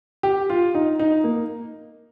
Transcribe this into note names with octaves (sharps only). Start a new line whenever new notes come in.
G4
F4
D#4
D#4
A#3